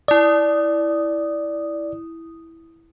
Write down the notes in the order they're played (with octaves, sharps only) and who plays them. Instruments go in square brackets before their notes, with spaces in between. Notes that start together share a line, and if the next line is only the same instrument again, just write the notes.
[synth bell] E4 D#6 [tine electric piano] D5